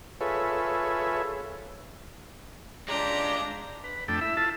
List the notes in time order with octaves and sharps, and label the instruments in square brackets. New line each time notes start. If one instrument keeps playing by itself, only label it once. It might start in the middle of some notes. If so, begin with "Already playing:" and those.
[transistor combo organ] F4 G#4 A4 B4 C#5 E5
[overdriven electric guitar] G#3 F4 [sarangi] D4 [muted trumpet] G4 [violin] A#5
[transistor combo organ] B4
F2 A3 D4 A4 G5 E6
E4 E5
E4 F4 A4 A5